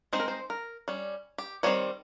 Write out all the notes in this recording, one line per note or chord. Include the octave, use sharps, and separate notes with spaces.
G#3 C4 D#4 C5
A#4
C5
A#4
G3 C#4
G4
D#3 G3 C4 C#5